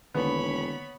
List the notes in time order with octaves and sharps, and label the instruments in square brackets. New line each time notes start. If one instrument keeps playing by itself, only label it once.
[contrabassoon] E1 [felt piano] D3 D#3 A#3 [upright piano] B3 [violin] C#5 B5